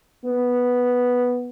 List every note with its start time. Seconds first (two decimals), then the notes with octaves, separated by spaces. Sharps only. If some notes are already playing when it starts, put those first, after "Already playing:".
0.25 B3